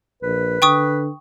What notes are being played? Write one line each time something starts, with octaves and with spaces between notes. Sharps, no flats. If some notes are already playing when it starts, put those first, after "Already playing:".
A#1 B4
D3 G5 C#6 D#6